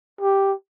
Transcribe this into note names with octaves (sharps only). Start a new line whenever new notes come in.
G4